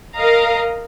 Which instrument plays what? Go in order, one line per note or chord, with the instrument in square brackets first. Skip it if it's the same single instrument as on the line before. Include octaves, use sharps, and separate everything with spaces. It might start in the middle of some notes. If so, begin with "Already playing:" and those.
[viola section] A#4 D#5 F5 A#5